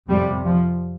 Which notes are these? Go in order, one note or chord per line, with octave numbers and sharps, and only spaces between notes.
F2 C3 G3
F3